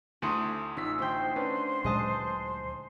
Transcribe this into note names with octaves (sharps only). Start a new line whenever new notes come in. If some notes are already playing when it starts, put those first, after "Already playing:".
D2 A3 E4 C6 D#6 C#7
A1 D#4 F4 E6 B6
D2 C5 G5
C#4 D4 B4
D2 A#2 F#3 G#3 D#5 A5